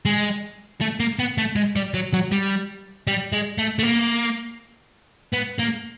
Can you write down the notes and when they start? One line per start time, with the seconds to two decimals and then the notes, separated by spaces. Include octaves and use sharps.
0.05 G#3
0.81 A3
1.00 A#3
1.19 B3
1.38 A3
1.56 G#3
1.76 G3
1.94 F#3
2.13 F#3
2.32 G3
3.07 G3
3.33 G#3
3.58 A3
3.79 A3
3.83 A#3
5.34 B3
5.59 A#3